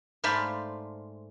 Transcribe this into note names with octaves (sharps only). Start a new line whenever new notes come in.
G#2 A3 C5 D5 F5 B5